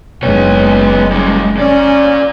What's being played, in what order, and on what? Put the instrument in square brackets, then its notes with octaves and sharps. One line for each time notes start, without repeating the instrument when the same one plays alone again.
[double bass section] F#1 G#3 [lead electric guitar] B3 C#5
[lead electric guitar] G3 C#4
[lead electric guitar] A#2 D5 [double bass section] C#4